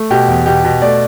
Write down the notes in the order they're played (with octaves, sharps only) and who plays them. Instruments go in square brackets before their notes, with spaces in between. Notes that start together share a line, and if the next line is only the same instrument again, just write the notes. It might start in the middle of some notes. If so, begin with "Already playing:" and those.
Already playing: [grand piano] A3
B2 G4
E2
B2 G4
B2
A3 D5